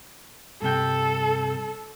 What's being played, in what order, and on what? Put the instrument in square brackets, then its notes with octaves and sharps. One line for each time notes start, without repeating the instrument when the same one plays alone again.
[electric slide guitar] G2 C3 G5 [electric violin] A4